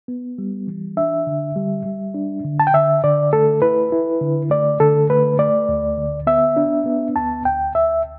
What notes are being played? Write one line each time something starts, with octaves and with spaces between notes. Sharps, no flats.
B3
G3
E3
D4 E5
D3
G3
G3
D4
D3
A5
G5
D3 E5
D3 D5
A3 A4
E4 B4
E4
D3
A3 D5
D3 A4
A3 B4
A3 D5
D2
D3
B3 E5
D4
B3
D2 A5
D2 G5
D2 E5